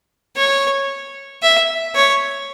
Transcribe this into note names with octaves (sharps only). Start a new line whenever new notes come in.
C#5
E5
C#5